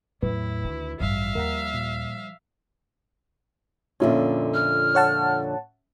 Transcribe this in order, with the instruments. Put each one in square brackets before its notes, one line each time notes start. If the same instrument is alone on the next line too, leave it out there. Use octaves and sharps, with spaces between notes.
[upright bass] E2 F#3 [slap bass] A2 [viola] E4 [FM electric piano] B4
[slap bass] D2 [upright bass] D#3 D#4
[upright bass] A1 G2 [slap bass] F3 G3 [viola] E5 F5
[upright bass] D#2 [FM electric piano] A#4 F#5 A#5
[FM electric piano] A#2
[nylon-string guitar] F2 A#2 D3 [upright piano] C#4 F4 E5
[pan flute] F6
[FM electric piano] C#5 F#5 A5